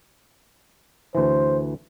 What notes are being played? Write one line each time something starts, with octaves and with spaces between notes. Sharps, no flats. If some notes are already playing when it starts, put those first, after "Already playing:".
D2 E3 C5